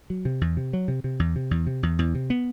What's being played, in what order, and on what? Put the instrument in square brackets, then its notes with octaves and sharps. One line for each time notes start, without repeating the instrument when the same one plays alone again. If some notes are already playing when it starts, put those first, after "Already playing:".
[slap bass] F#3
C3
E2
C3
F#3
C3
C3
E2
C3
E2
C3
E2
E2
C3
B3